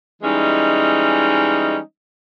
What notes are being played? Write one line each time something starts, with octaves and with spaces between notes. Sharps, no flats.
E3 G3 G#3 C#4 D#4